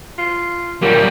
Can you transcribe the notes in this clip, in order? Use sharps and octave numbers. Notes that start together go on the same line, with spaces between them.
F4
A#2 D3 F#3 G3 G4